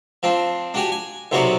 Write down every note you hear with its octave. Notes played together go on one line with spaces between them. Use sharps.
F3 C4 D4
D4 F#4 G4 G#5
G#5
B1 C3 F#3 B3 C#5 D5